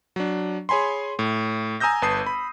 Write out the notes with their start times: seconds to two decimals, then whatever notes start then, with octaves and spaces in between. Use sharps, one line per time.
0.16 F#3 D4
0.69 G#4 C#5 G#5 B5 C6
1.19 A2
1.80 G#5 A#5 D#6 E6 G6 A#6
2.02 G1 B4 A5 D#6 C7
2.26 B5